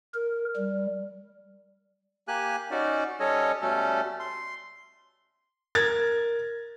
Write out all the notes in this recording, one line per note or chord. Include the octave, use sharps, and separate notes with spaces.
A#4
G3
A#3 G4 G#5 F#6
C#4 D#4 F#4 D5
G3 C#4 A4 C#5 D#5
B2 G3 A3 C#4 A4
C6
A#4 G#6 A6